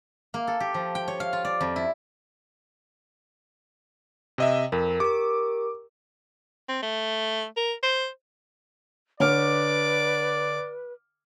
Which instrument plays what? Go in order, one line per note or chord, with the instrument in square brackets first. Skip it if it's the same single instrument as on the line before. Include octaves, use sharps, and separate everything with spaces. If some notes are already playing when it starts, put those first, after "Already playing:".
[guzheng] A#3
A4
G4
F3
G5
C#5
F5
F4
D5
F2
E4
[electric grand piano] C3 D#5 E5
[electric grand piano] F2 [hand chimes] A#4
[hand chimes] G4 A#4 [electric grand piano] D6
[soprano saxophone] C4
A3
A#4
C5
[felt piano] D3 C#5 F6 [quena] B4 [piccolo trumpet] D5 [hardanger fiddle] D6